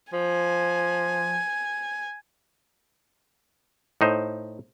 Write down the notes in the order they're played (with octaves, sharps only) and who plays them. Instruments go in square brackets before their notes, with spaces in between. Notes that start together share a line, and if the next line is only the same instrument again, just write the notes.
[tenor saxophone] F3 [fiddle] G#5
[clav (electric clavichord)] A2 D#4 C5